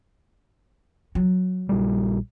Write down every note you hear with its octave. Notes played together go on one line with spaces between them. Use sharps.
F#3
A#1 G3